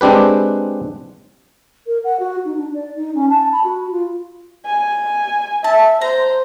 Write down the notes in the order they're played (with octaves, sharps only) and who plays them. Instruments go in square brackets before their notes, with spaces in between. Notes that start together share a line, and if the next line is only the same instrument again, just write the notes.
[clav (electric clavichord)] G#3 C4 D4 G4 B4
[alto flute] A#4
F#5
F#4
D#4
D4
D5
D#4
C#4
A5
B5
F#4
F4
[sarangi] G#5
[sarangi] E5 [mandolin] A5
[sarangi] C5 [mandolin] A#5